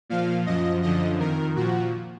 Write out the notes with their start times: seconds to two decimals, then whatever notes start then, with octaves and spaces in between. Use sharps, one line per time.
0.09 A#2 F3 F5
0.46 F#2 F3 D#5
0.82 F#2 D3 F3 D#5
1.20 F2 D#3 A#4
1.56 A#2 F3 F#4